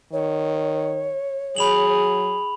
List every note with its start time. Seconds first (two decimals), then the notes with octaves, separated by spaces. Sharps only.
0.13 D#3 C#5
1.56 F#3 G#4 B5 F7 F#7